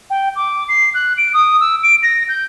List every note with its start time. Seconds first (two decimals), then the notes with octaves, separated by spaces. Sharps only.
0.10 G5
0.36 D6
0.69 C7
0.94 F#6
1.17 D7
1.34 D#6
1.60 E6
1.83 D7
2.03 A#6
2.28 G6